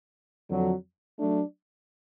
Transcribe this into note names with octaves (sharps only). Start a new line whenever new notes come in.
F2 D3 F#3
F#3 A3 D4